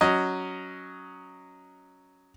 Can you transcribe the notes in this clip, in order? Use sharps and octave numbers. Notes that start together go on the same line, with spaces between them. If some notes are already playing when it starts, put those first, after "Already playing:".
F#3 C#4 D#5